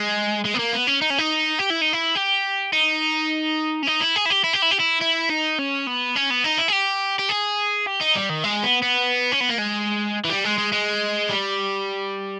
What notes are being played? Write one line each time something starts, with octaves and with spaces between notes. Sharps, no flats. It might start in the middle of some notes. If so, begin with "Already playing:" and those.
Already playing: G#3
G#3
B3
A#3
B3
C#4
D#4
C#4
D#4
G4
E4
D#4
E4
G4
D#4
C#4
D#4
E4
G#4
E4
G4
E4
G4
E4
G4
E4
E4
D#4
C#4
B3
C#4
B3
D#4
E4
G#4
G4
G4
G#4
G4
D#4
G3
D#3
G#3
B3
B3
C#4
B3
A#3
G#3
E3
G3
G#3
G#3
G#3
G3